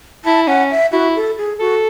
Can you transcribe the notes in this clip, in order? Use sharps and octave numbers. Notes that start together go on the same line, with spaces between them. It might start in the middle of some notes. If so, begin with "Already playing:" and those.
E4 A5
C#4 F#5
E5
E4 F#4
A4
G#4
F#4 A4